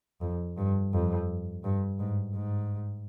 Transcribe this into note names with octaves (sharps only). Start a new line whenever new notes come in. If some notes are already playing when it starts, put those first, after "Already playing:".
F2
G2
F2
G2
G#2
G#2